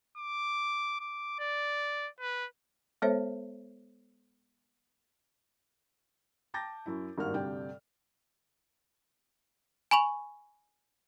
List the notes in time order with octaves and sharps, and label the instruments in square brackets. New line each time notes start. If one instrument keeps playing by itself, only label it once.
[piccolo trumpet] D6
D6
D5
B4
[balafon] G#3 B3 A4 C5 C#5 E5
[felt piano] G5 A5 D6 G6 A6 A#6
F#2 E4
G#1 G2 A#3 F#4 A#4 F6
D2 G2 C3 D5 G5
[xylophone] G#5 B5 C#6 F7